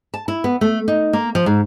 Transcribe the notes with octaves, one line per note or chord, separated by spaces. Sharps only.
A5
E4
B3
A3
D#4
A#3
F3
G#2